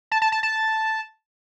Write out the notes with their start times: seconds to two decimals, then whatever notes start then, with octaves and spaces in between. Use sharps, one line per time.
0.12 A5
0.22 A5
0.32 A5
0.43 A5